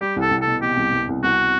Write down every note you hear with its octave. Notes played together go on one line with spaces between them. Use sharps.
G3 G4
C2 A4
C2
B2 A4
B2 G4
C2
C2
C2
C2 F#4